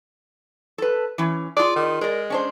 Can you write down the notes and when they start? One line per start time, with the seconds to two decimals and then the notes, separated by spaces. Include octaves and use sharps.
0.78 A4 B4
1.18 E3 C#4
1.57 F4 G#4 D5
1.76 D#3
2.01 G#3 A#4 D5
2.30 C#4 D4 C5